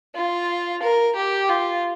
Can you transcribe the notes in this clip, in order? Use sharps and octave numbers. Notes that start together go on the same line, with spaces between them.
F4
A#4
G4
F4